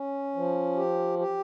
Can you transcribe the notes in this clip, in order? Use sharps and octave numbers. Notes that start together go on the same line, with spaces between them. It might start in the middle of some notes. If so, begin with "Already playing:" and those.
Already playing: C#4
F3
G4
G4